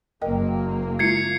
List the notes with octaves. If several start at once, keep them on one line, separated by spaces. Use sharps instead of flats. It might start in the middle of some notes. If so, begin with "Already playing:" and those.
F#1 A#3 A#4 D#5 G5
G#3 E4 F4 G#6 C7 C#7